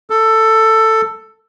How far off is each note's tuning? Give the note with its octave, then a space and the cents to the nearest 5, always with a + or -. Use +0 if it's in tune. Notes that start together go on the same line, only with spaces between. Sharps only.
A4 +10